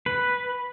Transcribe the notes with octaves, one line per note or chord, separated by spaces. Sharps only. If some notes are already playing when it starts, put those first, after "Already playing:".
B4